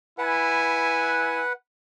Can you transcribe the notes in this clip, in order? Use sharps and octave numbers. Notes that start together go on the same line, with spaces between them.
E4 B4 F#5 G#5